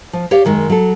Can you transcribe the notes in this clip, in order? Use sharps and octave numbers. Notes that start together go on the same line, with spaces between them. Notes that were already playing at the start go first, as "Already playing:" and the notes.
F3
G4 C#5 D5 F5
F#2 D#3 G#3
F#3 A4